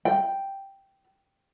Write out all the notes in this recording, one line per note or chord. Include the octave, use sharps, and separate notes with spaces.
G5